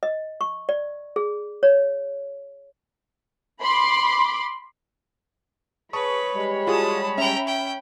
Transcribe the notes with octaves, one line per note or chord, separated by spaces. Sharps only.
D#5
C#6
D5
G#4
C#5
B5 C6 D6
G#4 B4 C#5 A5 B5 C#6 D#6
G3 G#3
F4 F#4 G#4 A5 D#6
C#4 E5 G5 A#5
G5